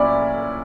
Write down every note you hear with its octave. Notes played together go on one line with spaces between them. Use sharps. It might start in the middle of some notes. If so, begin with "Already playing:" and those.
Already playing: A#2 C#4 E4 D5 B5